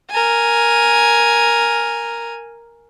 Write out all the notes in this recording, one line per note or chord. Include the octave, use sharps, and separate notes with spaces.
A#4 G#5